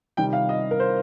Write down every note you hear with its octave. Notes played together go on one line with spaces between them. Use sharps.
C3 D#3 G3 G5
F5
D#5
A#4
C5